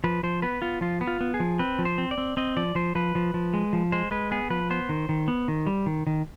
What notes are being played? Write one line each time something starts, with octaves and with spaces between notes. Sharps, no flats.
F3 B4
F3 C5
B3 B4
B3 F4
F3 F4
B3
F4
B3
G#4
F3
C4 B4
F3
C5
C4
D5
C4
C4 D#5
F3 D5
F3 C5
F3 B4
F3
F3
G#3
F3
G#3 C5
G#3 B4
B3 G#4
F3 B4
B3 C5
D#3
D#3
B3
D#3
G3
D#3
D#3